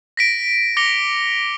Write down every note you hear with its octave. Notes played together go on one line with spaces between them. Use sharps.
A#6 B6 D7
D6 A#6 C#7 F7 G7